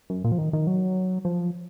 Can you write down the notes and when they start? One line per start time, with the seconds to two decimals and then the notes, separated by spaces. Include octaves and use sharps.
0.10 F#2
0.24 A#2
0.32 F3
0.38 D#3
0.53 D#3
0.67 F#3
1.25 F3